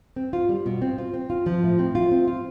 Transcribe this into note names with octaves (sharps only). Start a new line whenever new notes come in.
C4
F4
G3
B2
C4
F4
C4
F4
F3
A2
C4
F4
C4
F4